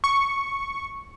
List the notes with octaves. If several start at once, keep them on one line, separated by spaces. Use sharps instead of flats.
C#6